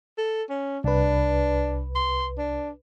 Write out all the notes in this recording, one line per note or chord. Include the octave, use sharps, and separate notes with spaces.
A4
C#4
C2 D4 B4
C6
D4